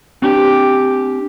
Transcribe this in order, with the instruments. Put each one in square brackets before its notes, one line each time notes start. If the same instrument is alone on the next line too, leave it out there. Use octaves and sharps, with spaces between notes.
[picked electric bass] C4 D4 [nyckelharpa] G4